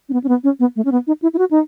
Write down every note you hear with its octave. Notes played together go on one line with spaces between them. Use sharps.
C#4
B3
C#4
B3
C#4
B3
A3
C#4
B3
D#4
E4
E4
F#4
D#4